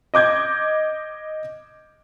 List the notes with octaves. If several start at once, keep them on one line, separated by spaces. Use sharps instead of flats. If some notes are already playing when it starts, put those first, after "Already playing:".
D#5 D6 G6 G#6